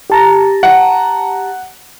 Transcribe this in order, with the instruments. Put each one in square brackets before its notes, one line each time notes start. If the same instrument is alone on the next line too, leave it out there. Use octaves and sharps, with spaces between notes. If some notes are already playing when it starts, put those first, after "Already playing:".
[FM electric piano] G4 A5 A#5
[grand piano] F#5